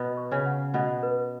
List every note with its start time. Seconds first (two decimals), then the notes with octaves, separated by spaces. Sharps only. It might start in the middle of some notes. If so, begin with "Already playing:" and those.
Already playing: B2 B3 B4
0.17 C#6
0.31 C#3 C#4
0.46 F#5
0.74 B2 B3 F#5
1.03 B4